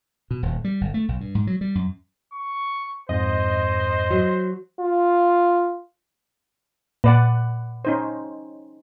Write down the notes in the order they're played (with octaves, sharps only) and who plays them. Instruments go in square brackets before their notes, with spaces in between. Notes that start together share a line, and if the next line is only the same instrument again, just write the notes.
[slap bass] B2
D#1
G3
G1
A3
B1
G2
G#2
F#3
G3
F#2
[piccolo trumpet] C#6
[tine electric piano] F2 G#2 [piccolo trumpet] C5 [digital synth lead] D#5
[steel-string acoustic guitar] F#3
[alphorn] F4
[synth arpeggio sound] A#2 [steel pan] B4 D5 F#5
[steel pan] C#4 D#4 C5